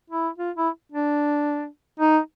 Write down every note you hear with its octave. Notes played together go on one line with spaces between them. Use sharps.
E4
F4
E4
D4
D#4